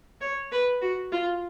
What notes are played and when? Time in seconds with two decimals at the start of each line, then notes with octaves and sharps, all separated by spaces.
0.21 C#5
0.52 B4
0.82 F#4
1.12 F4